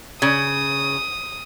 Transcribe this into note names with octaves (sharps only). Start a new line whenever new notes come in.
C#3 D#6